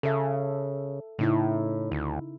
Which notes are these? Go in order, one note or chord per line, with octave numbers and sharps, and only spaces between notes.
C#3 A4 E5
A2 C#3 D#4 E4
D2